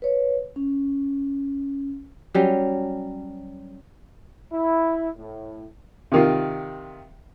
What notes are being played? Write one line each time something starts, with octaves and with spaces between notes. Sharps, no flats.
B4 C#5
C#4
F#3 G3 C#4
E4
A2
C3 D#3 F4